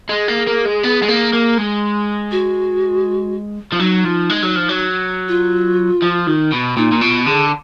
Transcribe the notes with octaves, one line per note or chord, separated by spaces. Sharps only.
G#3 G#4
A#3
A#3
G#3
B3
G#3
A#3
A#3
G#3
F#4
F3
F#3 D#4
F3
G#3
F#3
F3
F#3
F4
F3
D#3
B2
A#2 D#4
A#2
B2 F4
D3 G#4